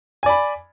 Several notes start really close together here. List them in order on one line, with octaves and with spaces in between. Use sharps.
G#5 D5 B5